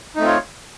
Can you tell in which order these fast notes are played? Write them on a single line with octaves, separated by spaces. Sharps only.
D#4 A3 C4 F4 C#5